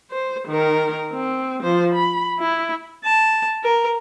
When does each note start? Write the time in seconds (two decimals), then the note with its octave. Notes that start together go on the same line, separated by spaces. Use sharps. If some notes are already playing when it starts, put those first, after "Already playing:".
0.11 C5
0.48 D#3 A#4
1.12 C4
1.63 F3 C5
1.95 B5
2.39 E4
3.04 A5
3.63 A#4